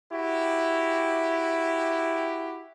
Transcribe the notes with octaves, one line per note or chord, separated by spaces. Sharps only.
E4 F#4 G4